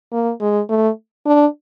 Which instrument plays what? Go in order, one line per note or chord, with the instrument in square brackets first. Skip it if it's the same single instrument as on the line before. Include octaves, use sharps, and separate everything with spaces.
[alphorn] A#3
G#3
A3
D4